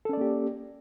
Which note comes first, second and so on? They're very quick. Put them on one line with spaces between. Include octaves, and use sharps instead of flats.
A4 C#4 D5 A#3 G4